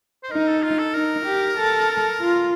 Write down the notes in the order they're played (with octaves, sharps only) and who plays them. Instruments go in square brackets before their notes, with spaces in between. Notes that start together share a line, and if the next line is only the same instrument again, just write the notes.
[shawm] C5
[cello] D#4 [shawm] A#4
[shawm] A4
F4
A4
[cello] D#4 [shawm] A#4
[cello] G4
A4
F4